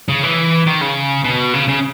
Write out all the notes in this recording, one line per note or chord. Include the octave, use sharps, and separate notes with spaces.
C#3
E3
D#3
C#3
B2
C#3
C#3